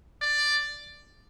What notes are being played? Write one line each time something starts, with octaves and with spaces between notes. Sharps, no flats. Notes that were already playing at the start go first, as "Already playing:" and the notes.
D5